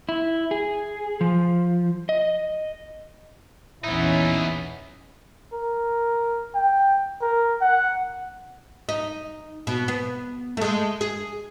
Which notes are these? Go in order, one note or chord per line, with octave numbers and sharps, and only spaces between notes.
E4
G#4
F3
D#5
A#1 E2 B3 C#4 D#4 E4
A#4
G5
A#4
F#5
D#4
B2
B3
G#3 A3
G#4